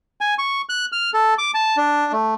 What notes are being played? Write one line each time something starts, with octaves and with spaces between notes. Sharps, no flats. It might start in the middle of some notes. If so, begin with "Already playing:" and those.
G#5
C#6
F#6
F6
A4
D6
A5
D4
A3